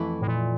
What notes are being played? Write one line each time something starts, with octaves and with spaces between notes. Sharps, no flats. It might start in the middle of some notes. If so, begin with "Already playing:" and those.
Already playing: F2 E3 A3 E4
A2
A#2